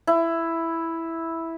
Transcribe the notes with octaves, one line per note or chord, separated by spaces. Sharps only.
E4